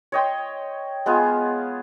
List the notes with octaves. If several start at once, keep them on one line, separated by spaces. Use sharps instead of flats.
C#5 D#5 G5 C6
G#3 B3 F4 G#4